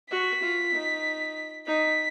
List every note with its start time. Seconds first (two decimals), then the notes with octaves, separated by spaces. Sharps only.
0.11 F#4 B6
0.43 F4
0.74 D#4
1.67 D#4 B6